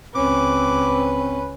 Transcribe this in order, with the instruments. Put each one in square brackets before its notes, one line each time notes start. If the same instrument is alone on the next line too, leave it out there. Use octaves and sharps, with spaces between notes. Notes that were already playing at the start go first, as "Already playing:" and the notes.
[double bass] C#2 C#4 [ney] C4 [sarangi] B4 [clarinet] D6